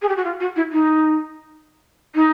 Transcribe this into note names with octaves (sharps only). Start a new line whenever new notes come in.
G#4
G4
F#4
F4
F#4
E4
D#4
D#4